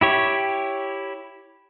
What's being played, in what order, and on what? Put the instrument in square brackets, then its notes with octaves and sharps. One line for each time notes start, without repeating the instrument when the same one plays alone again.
[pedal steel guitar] E4 G4 C#5